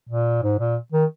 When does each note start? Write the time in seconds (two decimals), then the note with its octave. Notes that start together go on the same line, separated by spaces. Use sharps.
0.09 A#2
0.43 G#2
0.59 A#2
0.92 D#3